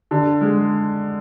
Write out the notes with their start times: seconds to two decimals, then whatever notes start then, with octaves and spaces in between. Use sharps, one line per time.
0.11 D3
0.41 G#3